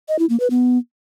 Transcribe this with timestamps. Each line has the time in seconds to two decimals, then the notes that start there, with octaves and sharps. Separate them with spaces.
0.08 D#5
0.19 E4
0.29 A#3
0.40 B4
0.50 B3